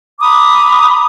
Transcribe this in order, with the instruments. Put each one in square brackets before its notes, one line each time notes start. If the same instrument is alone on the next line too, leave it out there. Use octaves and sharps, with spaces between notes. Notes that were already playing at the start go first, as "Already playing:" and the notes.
[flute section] A#5 B5 D6 D#6